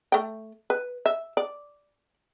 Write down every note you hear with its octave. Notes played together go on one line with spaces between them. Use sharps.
A3 G5
B4
E5
D5